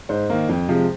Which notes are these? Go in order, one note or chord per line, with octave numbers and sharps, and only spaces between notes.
G#2 C5
D#3 A#3
F2
C3 F3 G#3